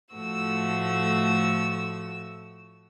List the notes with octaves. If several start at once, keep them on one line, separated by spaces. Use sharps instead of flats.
A2 F3 A3 F#4 E6